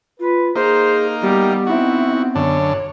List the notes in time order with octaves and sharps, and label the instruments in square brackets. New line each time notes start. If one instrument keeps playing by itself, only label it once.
[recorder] F4 [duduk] B4
[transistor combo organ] A#3 D#4 [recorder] G#4 [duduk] C5
[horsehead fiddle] G3 [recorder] B3 [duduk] G4
[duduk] C4 [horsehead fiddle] D#4 E4 [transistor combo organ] F#4
[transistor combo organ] F#2 D3 D4 [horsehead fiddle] C#5